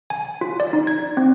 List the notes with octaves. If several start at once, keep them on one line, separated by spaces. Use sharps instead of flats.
G#5
F4
D5
D#4
G#6
C4